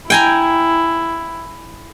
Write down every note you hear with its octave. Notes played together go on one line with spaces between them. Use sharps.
E4 G5 G#5 A#5